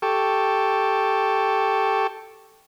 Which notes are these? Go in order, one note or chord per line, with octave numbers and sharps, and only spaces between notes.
G4 A4 C#6